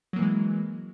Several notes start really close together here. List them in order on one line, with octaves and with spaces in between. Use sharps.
F#3 A#3 E3 G#3